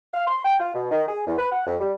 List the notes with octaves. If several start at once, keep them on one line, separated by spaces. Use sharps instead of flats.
F5
C6
G5
F4
B2
D#3
G#4
E2
B4
F#5
F2
G3